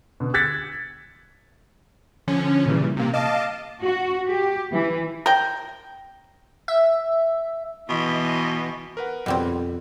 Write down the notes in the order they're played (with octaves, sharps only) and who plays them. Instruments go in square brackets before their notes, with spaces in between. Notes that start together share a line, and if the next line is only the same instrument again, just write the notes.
[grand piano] B2 D3
E6 F#6 G#6 A6 B6 C#7
[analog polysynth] D3 F3 C#4
A#2 C#3 E3 G3
C3 A#3
D#5 F5 A5 D6
[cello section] F#4
G4
E3
[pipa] A#4 G5
[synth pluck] E5
[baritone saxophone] B2 [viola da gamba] E3 D#5
[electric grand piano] A#4 B4 F#5
[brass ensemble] F2 [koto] B2 G3 C4